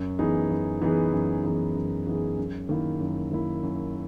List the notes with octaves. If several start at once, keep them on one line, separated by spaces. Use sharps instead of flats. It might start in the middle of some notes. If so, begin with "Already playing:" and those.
Already playing: F#2
E3 B3 D#4 G#4
F#2
E3 B3 D#4 G#4
F#2
E3 B3 D#4 G#4
F#2
E3 B3 D#4 G#4
F#2
D#3 A#3 E4
F#2
D#3 A#3 E4
F#2